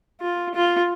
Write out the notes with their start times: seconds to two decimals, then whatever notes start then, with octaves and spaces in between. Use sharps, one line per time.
0.21 F4
0.55 F4